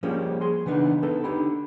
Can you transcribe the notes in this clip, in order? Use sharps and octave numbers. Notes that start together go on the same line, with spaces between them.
F3 G3 G#3 A#3 C#4
G#4 C6
C#3 E3 B3 D4 D#4
B3 D#4 A4
D3 D#4 G4 B5